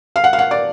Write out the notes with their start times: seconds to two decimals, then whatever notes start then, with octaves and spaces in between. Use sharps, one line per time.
0.16 F5
0.24 F#5
0.33 F5
0.39 F#5
0.51 D5